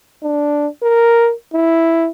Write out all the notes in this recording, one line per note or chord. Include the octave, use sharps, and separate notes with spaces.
D4
A#4
E4